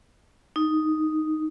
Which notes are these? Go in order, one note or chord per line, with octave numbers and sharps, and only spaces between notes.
D#4